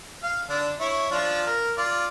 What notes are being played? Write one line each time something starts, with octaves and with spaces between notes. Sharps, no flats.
F5
D3 D4
E4 C#5
F3 D4 F4
A#4
F4 D5